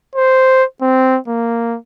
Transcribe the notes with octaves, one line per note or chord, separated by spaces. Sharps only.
C5
C4
A#3